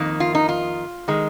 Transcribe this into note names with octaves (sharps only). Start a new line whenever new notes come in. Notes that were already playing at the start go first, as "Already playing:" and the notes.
Already playing: F2 D#3 A#3
F4
D#4
F4
D#3 G#3